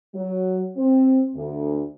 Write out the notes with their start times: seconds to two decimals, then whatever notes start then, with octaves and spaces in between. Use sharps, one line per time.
0.14 F#3
0.77 C4
1.35 D2